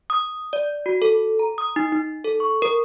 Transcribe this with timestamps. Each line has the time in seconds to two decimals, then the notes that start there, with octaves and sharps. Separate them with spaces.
0.10 D#6
0.53 D5
0.86 F#4
1.02 A4
1.39 A#5
1.58 D#6
1.76 D#4
1.92 D#4
2.25 A4
2.40 C#6
2.62 A#4